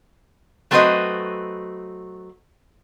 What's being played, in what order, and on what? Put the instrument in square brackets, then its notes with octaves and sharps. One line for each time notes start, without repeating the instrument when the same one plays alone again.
[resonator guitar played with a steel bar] F#3 A3 C4 F#4 B4 D#5